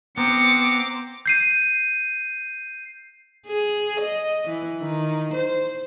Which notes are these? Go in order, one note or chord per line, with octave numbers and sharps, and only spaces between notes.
B3 C4 C5 A#5 D6 C#7
G6 C7 D#7
G#4
D#5
E3
D#3
C5